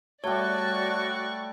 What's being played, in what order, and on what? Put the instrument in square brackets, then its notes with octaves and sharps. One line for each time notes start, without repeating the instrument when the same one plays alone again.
[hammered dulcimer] G3 A3 [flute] F#4 [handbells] C#5 [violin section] D5 C#6